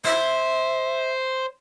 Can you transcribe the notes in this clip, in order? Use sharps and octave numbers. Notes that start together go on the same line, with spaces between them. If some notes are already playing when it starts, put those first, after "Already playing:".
C5 E5